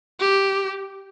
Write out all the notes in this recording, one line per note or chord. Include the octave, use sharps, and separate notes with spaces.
G4